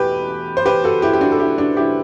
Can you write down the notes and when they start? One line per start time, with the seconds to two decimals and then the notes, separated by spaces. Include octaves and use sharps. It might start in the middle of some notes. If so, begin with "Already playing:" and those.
Already playing: E2 B2 A3 G4 B4
0.57 C5
0.66 G4 B4
0.84 F#4 A4
1.02 E4 G4
1.13 G4
1.21 D4 F#4
1.32 A4
1.40 E4 G4
1.58 D4 F#4
1.77 E4 G4